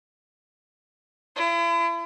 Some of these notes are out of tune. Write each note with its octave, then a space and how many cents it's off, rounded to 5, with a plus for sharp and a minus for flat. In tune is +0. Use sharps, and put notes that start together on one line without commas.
E4 +40